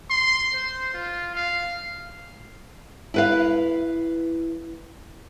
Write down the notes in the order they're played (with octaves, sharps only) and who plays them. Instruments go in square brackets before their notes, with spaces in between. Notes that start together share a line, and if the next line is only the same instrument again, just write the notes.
[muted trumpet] C6
C5
F4
F5
[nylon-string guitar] E4 B4 F5